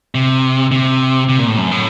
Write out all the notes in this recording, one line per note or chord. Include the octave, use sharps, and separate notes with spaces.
C3
C3
C3
A#2
A2
F#2
A2